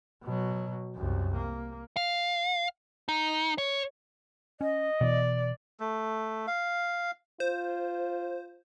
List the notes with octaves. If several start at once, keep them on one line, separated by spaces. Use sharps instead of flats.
B2 F#3
C2 F#2
A#3
F5
D#4
C#5
C#4 D#5
B2 E3 D5
A3
F5
F4 C5